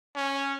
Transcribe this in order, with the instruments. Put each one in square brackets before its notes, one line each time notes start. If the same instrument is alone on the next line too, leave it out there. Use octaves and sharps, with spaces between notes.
[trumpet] C#4